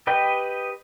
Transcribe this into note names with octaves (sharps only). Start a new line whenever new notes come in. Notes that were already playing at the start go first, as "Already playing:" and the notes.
G4 B4 D#5 G5